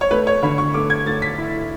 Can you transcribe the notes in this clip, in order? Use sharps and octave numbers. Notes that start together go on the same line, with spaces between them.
C#5
A3 B4
C#5
D3 B5
C#6
A3 D6
G#6
A3 A6
B6
E4